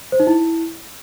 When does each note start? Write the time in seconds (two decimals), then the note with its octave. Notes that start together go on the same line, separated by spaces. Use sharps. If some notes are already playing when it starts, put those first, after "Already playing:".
0.12 C5
0.20 D#4
0.27 E4